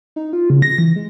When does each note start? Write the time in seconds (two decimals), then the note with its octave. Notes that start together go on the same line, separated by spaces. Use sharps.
0.16 D#4
0.33 F4
0.50 C#3
0.62 A#6
0.78 E3
0.96 G#3